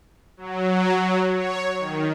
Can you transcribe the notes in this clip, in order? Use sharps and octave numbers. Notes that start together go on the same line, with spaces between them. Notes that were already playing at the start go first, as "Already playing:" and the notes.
F#3
F#3
C#5
D#3